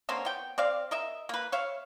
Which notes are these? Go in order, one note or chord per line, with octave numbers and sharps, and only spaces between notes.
D3 A#3 C4 C#4
B3 G5
C4 D5 F5
A#4 D#5 E5
A#3 B4
C#5 E5 F5